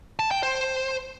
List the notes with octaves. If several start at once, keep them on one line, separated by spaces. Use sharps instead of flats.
A5
G5
C5